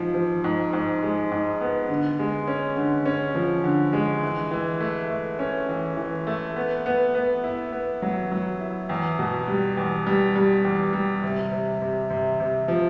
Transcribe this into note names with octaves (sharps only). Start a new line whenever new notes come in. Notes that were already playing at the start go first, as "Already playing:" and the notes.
Already playing: G#2 F3
F3
G#2
G#2
G#3
G#2
B3
D3
G#3
C#4
D3
C#4
F3
D3
G#3
E3
E3
A3
A3
C#4
E3
E3
A3
B3
B3
B3
E4
B3
F#3
F#3
E4
E2
B2
G3
E2
G3
G3
E2
G3
C3
C3
C3
C3
C3
F3